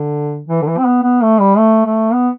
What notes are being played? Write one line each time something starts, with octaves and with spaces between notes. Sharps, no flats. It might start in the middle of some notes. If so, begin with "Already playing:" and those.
Already playing: D3
E3
D3
E3
C4
B3
B3
A3
G3
A3
A3
B3